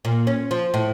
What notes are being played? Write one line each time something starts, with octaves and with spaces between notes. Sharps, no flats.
A#2
C#4
F3
A2